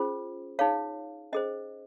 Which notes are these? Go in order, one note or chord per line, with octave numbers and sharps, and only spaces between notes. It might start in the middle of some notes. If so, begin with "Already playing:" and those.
Already playing: C#4 F4 G#4 C5
D#4 G#4 C#5 F5
C#4 G#4 C5 D#5